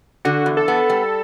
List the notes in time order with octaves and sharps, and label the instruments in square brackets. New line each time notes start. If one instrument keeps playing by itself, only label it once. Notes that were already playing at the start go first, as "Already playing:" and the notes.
[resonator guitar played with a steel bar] D3 [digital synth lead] F#4
[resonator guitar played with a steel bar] E2
[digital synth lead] A4
[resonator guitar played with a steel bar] B3
G3